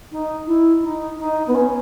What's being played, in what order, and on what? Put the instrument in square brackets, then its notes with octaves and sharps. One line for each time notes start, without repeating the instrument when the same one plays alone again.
[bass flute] D#4
E4
D#4
D#4
B3
C#4